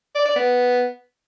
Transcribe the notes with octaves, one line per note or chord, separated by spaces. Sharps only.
D5
D5
B3